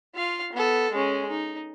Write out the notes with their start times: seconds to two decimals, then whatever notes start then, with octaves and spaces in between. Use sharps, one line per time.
0.15 F4 F5
0.53 B3 A4
0.91 G#3 C#4
1.30 D#4